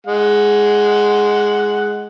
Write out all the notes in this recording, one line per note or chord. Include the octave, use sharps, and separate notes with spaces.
G#3 F#5